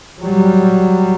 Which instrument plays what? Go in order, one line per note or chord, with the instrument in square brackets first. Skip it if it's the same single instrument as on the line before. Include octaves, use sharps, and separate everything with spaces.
[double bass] F#3 G3